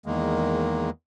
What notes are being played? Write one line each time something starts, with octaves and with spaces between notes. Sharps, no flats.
E2 D#3 G#3 A#3